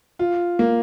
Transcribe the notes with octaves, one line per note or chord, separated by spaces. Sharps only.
F4
A#3